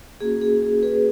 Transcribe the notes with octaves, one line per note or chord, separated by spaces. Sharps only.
A#3 C#4 F#4 G#4
G#4
G#4
G#4 B4